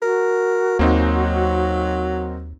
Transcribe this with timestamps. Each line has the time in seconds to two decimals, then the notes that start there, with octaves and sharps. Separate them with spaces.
0.02 F#4 A#4
0.79 D#2 F#3 A#3 C4 D#4